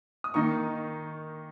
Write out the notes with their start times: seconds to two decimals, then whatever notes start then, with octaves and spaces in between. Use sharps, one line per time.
0.24 D#6
0.34 D#3 A#3 D#4 C#6